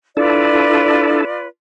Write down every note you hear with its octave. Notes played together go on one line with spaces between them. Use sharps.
D4 E4 F4 A4 B4 D5